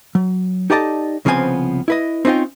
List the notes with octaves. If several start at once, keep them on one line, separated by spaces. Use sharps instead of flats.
F#3
D#4 G4 A4 D5 D#5 A5
C2 C#3 F3 B3 C4 G#5
E4 B4 D#5
C4 C#4 D#4 F4 G5